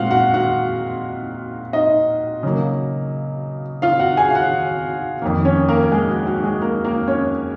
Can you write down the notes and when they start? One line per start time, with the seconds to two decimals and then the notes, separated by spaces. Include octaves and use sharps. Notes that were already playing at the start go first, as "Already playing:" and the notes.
Already playing: A#2 G#3 C4 F4 F#4 F5 F#5
0.11 F#4 F#5
0.34 F#4 F#5
1.73 D#4 D#5
2.43 C#3 F#3 A#3
3.82 F4 F5
3.99 F#4 F#5
4.17 G#4 G#5
4.30 F5
4.35 F#4 F#5
5.22 F2 D#3 A#3
5.45 C#4 C#5
5.69 A#3 A#4
5.83 A#4
5.92 G#3 G#4
6.09 F#4
6.27 F#4
6.44 G#3 G#4
6.61 A#3 A#4
6.85 A#3 A#4
7.08 C#4 C#5